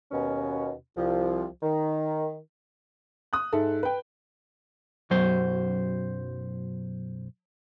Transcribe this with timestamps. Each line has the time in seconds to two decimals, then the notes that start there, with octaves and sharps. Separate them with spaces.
0.12 D#2 B2 C#4
0.97 C2 F3
1.62 D#3
3.33 D#6 F#6
3.52 G#2 A4 E5
3.83 B4 G5
5.10 B1 F#2 F#3 C5